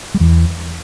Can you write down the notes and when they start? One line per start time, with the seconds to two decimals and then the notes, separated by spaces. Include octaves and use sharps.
0.14 G3
0.20 E2 E3